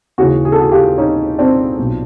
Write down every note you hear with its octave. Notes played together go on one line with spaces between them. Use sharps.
D#2 C#3 E3 F#4 G#4
G#4
A4
F#4 G#4
F4 G4
C#4 D#4
C4 D4
B1 A#2